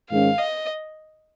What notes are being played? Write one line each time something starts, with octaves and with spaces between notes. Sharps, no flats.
G#2 D#3 G#3 C#4 F5
D#5